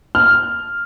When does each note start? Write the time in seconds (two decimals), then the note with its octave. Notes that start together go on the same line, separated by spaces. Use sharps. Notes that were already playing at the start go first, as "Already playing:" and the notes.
0.15 F6